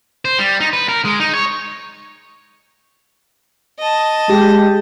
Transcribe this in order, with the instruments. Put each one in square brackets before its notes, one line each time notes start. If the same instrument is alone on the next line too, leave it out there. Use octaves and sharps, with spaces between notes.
[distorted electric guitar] C5
G3
D#4
B4
A#4
G#3
D#4
C#5
[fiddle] D#5 A5
[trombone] G#3 [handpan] G4